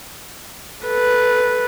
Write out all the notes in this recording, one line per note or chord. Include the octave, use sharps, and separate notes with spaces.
A4 B4